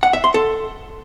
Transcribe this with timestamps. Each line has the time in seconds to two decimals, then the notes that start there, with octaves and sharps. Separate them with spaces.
0.03 F#5
0.13 E5
0.24 C6
0.34 A4